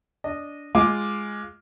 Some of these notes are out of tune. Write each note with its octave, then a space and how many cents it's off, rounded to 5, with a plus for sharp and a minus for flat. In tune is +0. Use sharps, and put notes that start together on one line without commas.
D4 -15 D#5 -15
G#3 +0 F4 +0 D6 +0